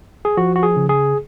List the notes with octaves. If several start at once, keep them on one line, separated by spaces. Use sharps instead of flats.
G#4
F3 F#4
F#4
G#4
C#3
G#4